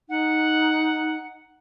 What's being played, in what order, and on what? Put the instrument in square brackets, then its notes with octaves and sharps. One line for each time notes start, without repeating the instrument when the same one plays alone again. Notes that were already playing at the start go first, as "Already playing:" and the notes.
[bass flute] D#4 [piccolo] F#5